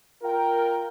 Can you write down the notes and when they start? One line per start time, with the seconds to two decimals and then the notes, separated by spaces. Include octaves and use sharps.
0.23 F4 A#4 G5